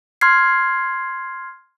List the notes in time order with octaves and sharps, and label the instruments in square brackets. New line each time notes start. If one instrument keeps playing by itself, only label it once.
[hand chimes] C6 F6 G#6 C7